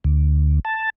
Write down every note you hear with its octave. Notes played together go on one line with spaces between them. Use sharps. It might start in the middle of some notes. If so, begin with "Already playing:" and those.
D2
A5